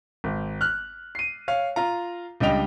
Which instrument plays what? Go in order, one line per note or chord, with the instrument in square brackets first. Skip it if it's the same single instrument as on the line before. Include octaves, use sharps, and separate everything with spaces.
[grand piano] G#1
F6 F#6
C7 D#7
C#5 F5
F4 A#5
C#2 G3 D4 D#5 G5 F7